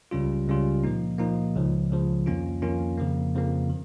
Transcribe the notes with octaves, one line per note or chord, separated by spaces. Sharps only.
C#2 C#3 G3 C#4 F4
C#2 C#3 G3 C#4 F4
A#2 F3 A#3 D#4
A#2 F3 A#3 D#4
C#2 C#3 F3
C#2 C#3 F3
F2 D#3 A#3 C#4 F4
F2 D#3 A#3 C#4 F4
F2 C#3 F3 A#3
F2 C#3 F3 A#3
D#3